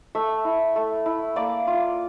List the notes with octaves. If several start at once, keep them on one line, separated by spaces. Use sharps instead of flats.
A3 E5
E4
A3
E4
A#3 D5
F4